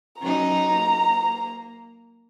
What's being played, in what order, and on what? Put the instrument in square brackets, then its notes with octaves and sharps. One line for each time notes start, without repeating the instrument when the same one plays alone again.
[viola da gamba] F#3 C#4 D#4 [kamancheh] A#5
[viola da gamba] A#3